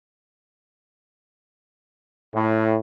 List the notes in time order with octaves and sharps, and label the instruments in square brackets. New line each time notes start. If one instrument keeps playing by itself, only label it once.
[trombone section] A2